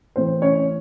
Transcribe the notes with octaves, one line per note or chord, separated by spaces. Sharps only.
A2 E3 C4 C5
C#4 C#5